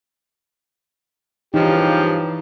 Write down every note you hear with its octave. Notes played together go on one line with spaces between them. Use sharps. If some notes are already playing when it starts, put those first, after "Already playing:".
G2 C#3 E3 F3 D#4 G4